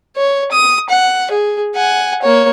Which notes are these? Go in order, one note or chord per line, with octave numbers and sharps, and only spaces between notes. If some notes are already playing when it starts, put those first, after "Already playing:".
C#5
D#6
F#5
G#4
F#5 G#5
A#3 C#5